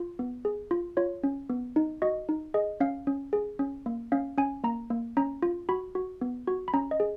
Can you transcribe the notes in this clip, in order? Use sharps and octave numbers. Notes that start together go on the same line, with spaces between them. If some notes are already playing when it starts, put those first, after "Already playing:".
Already playing: F4
B3
G#4
F4
F4 C#5
C#4
B3
D#4
F#4 D#5
D#4
G#4 D#5
C#4 F5
C#4
G#4
C#4
A#3
C#4 F5
C#4 G#5
A#3 A#5
A#3
C#4 A#5
F4
F#4 B5
F#4
B3
F#4
B5
C#4 A#5
D#5
G#4